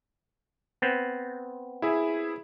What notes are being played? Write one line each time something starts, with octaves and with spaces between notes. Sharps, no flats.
B3 C4
E4 G#4 E5